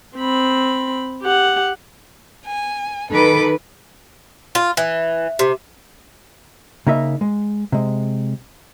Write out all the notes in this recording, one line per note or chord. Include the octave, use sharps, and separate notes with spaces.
C4 B5
G4 F#5
G#5
D#3 A4 B4 D6
F4
E3
C3
C#3 A#3 D#4 D#5 E5
G#3
C3 G#3